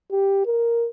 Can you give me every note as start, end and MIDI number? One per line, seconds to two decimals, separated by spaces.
0.11 0.43 67
0.46 0.87 70